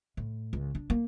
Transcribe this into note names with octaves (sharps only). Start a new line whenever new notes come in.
A2
C#2
D4
A#3